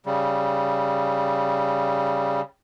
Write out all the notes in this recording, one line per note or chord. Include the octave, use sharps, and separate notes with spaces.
C#3 G3